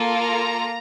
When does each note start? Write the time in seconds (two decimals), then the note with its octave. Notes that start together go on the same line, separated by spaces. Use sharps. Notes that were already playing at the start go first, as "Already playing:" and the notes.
Already playing: A#3 F4 A4
0.18 A#5